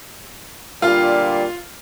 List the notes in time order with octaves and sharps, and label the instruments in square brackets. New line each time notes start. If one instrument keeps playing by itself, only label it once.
[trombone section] A#2 D3 G3 [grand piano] F4 F5